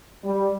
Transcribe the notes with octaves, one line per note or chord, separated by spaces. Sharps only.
G3